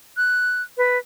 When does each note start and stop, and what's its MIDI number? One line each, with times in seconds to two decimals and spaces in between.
0.17 0.62 90
0.77 0.98 71